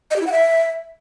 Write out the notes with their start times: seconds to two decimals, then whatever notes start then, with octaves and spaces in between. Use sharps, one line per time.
0.11 D#5
0.16 G4
0.21 E4
0.27 F#5
0.32 E5